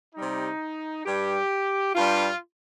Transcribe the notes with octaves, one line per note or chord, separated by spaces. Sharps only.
C3 G3 D#4
G2 G3 G4
G2 G3 F4